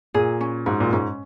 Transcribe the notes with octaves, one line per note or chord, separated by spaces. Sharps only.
A#2 G#4
C#4
G#2 F#4
A#2
G#2 C#4